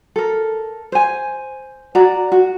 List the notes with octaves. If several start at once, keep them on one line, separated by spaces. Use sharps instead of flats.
A4 A#4
C5 G#5
F#4 D5 A#5
F#4